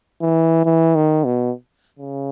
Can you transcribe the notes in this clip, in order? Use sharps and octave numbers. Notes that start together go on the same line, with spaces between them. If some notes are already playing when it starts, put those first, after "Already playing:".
E3
E3
D#3
B2
C#3